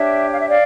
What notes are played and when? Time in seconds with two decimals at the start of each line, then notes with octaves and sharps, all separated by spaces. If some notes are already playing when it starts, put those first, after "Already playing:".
Already playing: D4 G4 C#5 E5
0.31 F5
0.39 E5
0.49 D5 F5